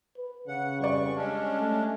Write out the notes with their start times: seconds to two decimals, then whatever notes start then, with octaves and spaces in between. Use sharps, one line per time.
0.17 B4
0.48 C#3 F#5
0.80 F2 G3 B4 D5 C#6
1.15 G#3 C#4 D4
1.60 A3